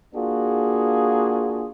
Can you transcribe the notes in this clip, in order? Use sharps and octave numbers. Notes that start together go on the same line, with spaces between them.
A#3 D4 F4 F#4 G#4